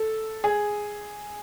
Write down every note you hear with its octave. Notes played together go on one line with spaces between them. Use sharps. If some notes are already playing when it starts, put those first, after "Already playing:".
Already playing: A4
G#4